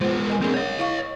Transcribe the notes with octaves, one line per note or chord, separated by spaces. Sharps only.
G#3 A#3 B3 F4 C5
A#4 D#5 G#5
A#3 C4 D4 G#4 A#4
A#3 C#5 D#5
E4 F5 C#6